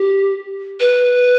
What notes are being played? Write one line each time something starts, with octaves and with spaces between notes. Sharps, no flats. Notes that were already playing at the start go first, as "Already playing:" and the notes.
Already playing: G4
B4